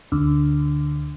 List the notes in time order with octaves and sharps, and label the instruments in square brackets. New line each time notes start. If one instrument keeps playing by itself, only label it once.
[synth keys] D2